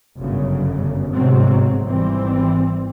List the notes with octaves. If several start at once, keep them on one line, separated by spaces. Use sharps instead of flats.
G1 F#2 C#3
G1 G#2 C3 F#3 C4
G#1 E3 G3 C4